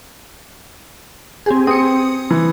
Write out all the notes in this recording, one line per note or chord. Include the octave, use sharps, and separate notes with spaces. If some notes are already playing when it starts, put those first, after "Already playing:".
C4 G4 G#4
C4 D#6 C#7
E3